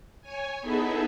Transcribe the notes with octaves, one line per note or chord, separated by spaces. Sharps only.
C#5 G#5
B3 D#4 E4 G#4 A4 E5